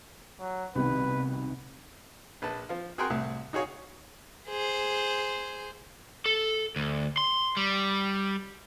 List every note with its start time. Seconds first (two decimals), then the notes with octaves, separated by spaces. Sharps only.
0.40 F#3
0.75 C2 B2 D#3 B4
2.42 A#1 B4 A5
2.69 F3 F4
2.98 F#4 G#4 A#4 G5 C6 F#6
3.10 C2 A2
3.53 D#4 F#4 G#4 C#5 F5
4.48 G#4 C5
6.26 A4
6.76 D2
7.17 C6
7.57 G3